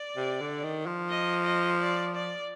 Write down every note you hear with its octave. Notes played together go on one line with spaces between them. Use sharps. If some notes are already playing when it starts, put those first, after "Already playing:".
Already playing: D5
C3
D3
D#3
F3
D#5
D#5
D5
D5